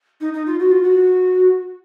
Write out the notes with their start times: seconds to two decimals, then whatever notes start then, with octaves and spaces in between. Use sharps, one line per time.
0.21 D#4
0.33 D#4
0.46 F4
0.60 F#4
0.71 F4
0.83 F#4